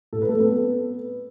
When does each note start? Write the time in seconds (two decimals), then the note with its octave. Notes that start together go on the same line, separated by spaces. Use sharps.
0.13 A2 A4
0.22 B4
0.29 A3 A4
0.39 F#3 B3 C4 B4